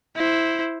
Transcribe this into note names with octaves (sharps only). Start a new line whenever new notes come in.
E4 C5